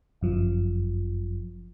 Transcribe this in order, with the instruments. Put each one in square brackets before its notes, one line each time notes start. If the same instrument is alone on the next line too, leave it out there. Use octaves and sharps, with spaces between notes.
[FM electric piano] G1 F#2 F3